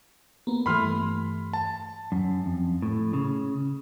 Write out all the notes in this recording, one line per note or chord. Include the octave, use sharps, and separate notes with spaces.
A#3 B3
G2 E3 A3 B5 C6 F6
A5
F#2
F2
A2
C#3